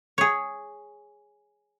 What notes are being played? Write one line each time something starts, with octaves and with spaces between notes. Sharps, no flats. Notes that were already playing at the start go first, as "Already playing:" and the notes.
G#4 C#5